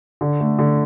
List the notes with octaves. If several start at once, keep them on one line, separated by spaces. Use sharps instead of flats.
D3
A3
D3